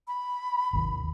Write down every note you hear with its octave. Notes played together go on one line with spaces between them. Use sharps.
B5
G#1 D#2